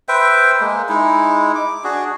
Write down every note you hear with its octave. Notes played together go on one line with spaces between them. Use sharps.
B4 C5 E5 G5
G#3 A#3
G#3 D#4 E4
D6
D4 F#4 G#4